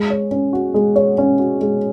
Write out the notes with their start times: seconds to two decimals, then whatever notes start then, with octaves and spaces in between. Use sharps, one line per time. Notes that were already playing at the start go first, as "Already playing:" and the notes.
Already playing: G#3
0.10 C#5
0.31 C#4
0.53 F#4
0.74 G#3
0.96 C#5
1.18 C#4
1.39 F#4
1.61 G#3